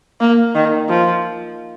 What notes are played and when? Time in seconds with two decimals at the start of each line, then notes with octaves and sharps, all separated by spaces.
0.21 A#3
0.55 D#3
0.89 F3